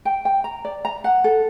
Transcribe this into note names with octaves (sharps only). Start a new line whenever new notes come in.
G5
G5
A#5
D5
A#5
F#5
A4